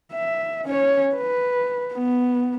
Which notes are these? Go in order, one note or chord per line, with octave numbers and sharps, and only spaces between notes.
E5
C#4 C#5
B4
B3